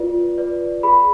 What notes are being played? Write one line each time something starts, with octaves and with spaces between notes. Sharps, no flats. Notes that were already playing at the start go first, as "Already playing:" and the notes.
Already playing: F4 B4 D5
B4 D5
G#4 B5